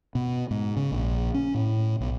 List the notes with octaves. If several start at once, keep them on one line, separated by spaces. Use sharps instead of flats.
B2
G#2
C#3
A#1
C#4
A2
B1